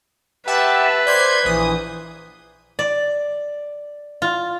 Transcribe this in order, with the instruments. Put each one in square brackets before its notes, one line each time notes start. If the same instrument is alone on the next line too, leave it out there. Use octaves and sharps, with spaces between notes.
[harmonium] G4 F#5 G5 [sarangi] B4 [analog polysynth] E5 A5
[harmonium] C5 D5 [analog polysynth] G6 G#6 C7
[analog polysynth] A#1 D#6 [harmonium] E3
[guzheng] D5
F4